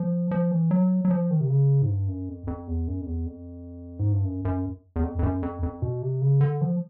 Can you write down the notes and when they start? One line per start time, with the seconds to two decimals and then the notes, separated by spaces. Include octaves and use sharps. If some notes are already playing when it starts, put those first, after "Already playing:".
Already playing: F3
0.31 F3
0.51 E3
0.71 F#3
1.05 F#3
1.11 F3
1.31 D#3
1.41 C3
1.50 C#3
1.82 G#2
1.90 G2
2.08 F#2
2.29 F2
2.47 F2
2.67 E2
2.88 F#2
3.01 F2
3.06 E2
3.26 F2
3.99 G#2
4.12 G2
4.25 F#2
4.45 F#2
4.96 E2
5.03 F2
5.19 F2
5.23 F#2
5.43 F2
5.63 F2
5.82 B2
6.02 C3
6.22 C#3
6.41 D3
6.61 F3